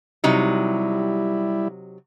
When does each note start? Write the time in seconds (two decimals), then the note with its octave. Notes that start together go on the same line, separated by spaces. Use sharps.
0.24 C3 F#3 G3 D#4 E4